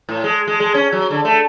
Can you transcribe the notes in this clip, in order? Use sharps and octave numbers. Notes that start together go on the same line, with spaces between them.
A2
G#3
G#3
G#3
C#4
F#3
D3
A3